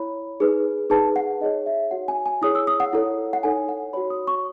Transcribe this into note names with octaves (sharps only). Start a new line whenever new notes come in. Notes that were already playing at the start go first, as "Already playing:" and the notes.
Already playing: E4 C#5 B5
D#4 G#4 B4
D#4 G#4 B4 A5
F#5
D#4 G#4 C#5 D#5
E5
F#4 C#5 F#5
G#5
G#5
E4 G#4 C#5 D#6
E6
D#6
F#5
E4 A4 C#5
F#5
D#4 A4 C#5 G#5
F#5
F#4 C#5 B5
D#6
C#6